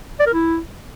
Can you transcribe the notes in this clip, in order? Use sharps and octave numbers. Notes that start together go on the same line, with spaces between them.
D5
A#4
E4